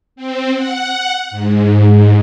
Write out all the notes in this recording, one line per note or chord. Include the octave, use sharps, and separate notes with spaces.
C4
F#5
G#2